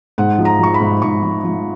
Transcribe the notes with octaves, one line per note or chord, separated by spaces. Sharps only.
G#2 F#5
F3
A#5
F3 C#6
B5
G#2
G#2 C#6
F3
F3